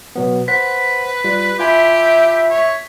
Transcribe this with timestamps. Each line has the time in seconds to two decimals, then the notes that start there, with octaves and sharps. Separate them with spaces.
0.16 B2 F#3 B3
0.48 B4 C5 F#5 B6
1.24 G3 F4
1.59 F4 G4 E5 G#5 B5
2.50 C#5